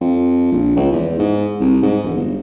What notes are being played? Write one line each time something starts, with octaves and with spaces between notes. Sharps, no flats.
F2
A#1
C#2
E2
G#2
C2
G#2
E1
G1